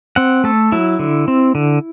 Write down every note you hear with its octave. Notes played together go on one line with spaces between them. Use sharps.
C4 F#5
A3 A4
F#3 E4
D3
C4
D3